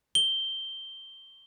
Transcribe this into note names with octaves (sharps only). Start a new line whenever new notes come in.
G7